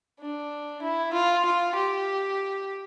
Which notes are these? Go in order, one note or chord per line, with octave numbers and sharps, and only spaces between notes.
D4
E4
F4
F4
G4